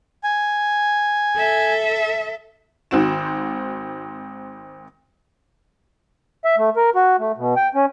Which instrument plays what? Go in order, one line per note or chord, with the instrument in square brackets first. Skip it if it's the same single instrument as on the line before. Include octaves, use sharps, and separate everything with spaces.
[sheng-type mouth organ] G#5
[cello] A4 E5
[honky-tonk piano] G#1 D#3 C4 F#4 E7
[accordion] E5
A3
A#4
F#4
A3
B2
G5
C#4